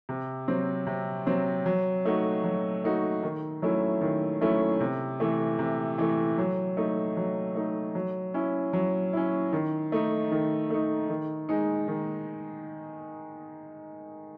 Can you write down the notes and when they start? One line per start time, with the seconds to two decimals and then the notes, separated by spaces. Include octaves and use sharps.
0.09 C3
0.48 F#3 C4
0.87 C3
1.26 F#3 C4
1.66 F#3
2.05 A3 D#4 F#4
2.44 F#3
2.84 A3 D#4 F#4
3.23 D#3
3.62 F#3 A3 C#4 E4
4.01 D#3
4.41 F#3 A3 C#4 E4
4.81 C3
5.20 E3 A3
5.59 C3
5.98 E3 A3
6.38 F#3
6.77 A3 D#4
7.17 F#3
7.55 A3 D#4
7.95 F#3
8.34 C#4 E4
8.73 F#3
9.13 C#4 E4
9.53 D#3
9.92 A3 D#4
10.32 D#3
10.70 A3 D#4
11.09 D#3
11.49 G#3 D#4
11.88 D#3